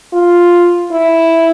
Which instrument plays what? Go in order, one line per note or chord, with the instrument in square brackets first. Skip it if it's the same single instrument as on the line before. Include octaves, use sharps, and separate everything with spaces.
[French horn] F4
E4